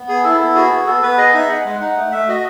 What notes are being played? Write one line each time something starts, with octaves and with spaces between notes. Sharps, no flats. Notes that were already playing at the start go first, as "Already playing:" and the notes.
Already playing: B3
G#4
E4 A4
B3 A4
F#4 G#4
B3
B3 A4
B3 B4
G#4 D#5
D#4 E5
G#4 F#5
G#3
D#4 F#5
A3
A3 E5
F#4 D#5